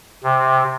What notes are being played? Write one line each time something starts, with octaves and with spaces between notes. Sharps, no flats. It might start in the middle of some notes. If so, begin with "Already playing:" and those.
C3